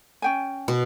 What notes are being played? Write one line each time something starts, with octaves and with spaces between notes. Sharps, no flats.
C#4 G5 G#5
B2